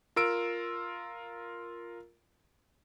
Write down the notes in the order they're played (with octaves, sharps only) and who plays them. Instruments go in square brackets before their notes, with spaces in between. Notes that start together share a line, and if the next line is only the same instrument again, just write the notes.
[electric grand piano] F4 A#4 E6 D7